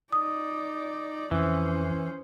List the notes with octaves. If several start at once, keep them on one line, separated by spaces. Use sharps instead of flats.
D#4 D5 D#6
F2 E3 C#4 C5